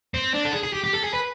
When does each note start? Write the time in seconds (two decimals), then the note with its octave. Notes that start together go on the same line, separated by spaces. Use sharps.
0.14 C4
0.34 D4
0.45 A4
0.53 G#4
0.63 G#4
0.73 G4
0.84 G4
0.94 A4
1.04 G#4
1.13 B4